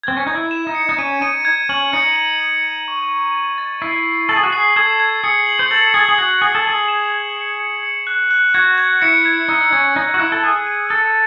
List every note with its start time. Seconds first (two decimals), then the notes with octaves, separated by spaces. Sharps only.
0.03 C4 G#6
0.17 C#4
0.27 D#4 G#6
0.35 E4
0.51 E7
0.67 D#4
0.75 C#7
0.89 D#4
0.98 C#4 D#7
1.21 D#4 D#7
1.45 G#6
1.69 C#4 F#7
1.93 D#4 C#7
2.16 F#7
2.40 F#7
2.64 C#7
2.88 C#6
3.11 C#6
3.34 A6
3.58 A6
3.82 E4 C7
4.06 C7
4.29 A4 F#7
4.36 G#4
4.43 F#4
4.50 G#4 C7
4.76 A4 G#6
5.00 G#6
5.24 G#4 C#7
5.47 F#7
5.59 C5
5.71 A4 F#7
5.94 G#4 G#6
6.09 G#4
6.18 F#4 G#6
6.42 G#4 G#6
6.55 A4
6.65 G#4 C#7
6.88 E7
7.12 G#6
7.37 C#7
7.60 C#7
7.83 C#7
8.07 F#6
8.31 F#6
8.54 F#4 G#6
8.78 G#6
9.02 E4 C#7
9.25 G#6
9.48 D#4 E6
9.73 C#4 G#6
9.96 D#4 C#7
10.14 F#4
10.20 E4 E6
10.32 A4
10.44 G#4 G#6
10.67 D#7
10.90 A4 E6